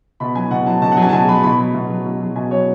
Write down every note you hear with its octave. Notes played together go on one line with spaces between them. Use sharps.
B2 B5
F#3 G#5
B2 F#5
F#3 A5
B2 A5
F#5
F#3
G#5
A5
B2 G#5
F#3 B5
B2 B5
F#3 B5
B2
F#3
B2
F#3
B2 G#5
F#3 C#5